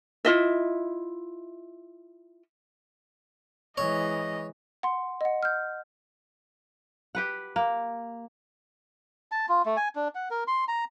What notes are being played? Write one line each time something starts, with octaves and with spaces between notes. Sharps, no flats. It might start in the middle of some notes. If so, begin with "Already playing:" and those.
E4 F4 D#5 E5
E3 G#3 C#5 D#5
F#5 C6
D#5 F#5
F6 G6
G4 B4 F#5
A#3
A5
F4
A3
G#5
D4
F#5
A#4
C6
A#5